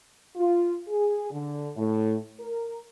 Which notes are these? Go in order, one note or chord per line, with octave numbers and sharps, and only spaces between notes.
F4
G#4
D3
A2
A#4